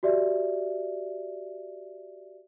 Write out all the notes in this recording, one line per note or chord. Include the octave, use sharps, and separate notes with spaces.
F#4 G4 D5 E5